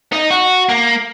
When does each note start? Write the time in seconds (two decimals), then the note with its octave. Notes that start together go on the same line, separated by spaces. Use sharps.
0.12 D#4
0.30 F#4
0.69 A#3